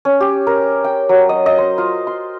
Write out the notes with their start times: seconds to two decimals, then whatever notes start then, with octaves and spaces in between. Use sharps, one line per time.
0.05 C#4
0.20 G4
0.47 A#4
0.84 G5
1.09 F#3
1.29 D#5
1.46 D#5
1.58 C5
1.78 F4
2.07 C6